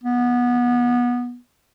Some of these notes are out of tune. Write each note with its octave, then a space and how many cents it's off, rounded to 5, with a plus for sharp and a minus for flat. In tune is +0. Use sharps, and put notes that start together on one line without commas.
B3 -20